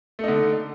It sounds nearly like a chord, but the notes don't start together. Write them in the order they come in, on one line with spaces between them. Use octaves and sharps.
A3 D#4 D3